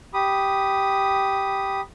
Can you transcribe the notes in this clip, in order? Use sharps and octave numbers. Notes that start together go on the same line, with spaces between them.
G4 B5 D#6